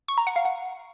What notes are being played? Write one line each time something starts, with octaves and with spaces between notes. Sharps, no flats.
C#6
A#5
F#5
F5
F#5